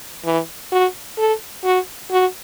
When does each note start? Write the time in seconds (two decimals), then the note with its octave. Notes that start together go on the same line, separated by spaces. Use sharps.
0.25 E3
0.72 F#4
1.18 A4
1.64 F#4
2.11 F#4